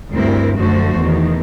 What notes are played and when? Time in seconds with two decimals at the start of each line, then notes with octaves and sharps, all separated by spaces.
0.11 D2 G2 C4 E4 A#4
0.58 F#2 D3 F3 A3 F#4 C5
0.97 E2 B2 D#3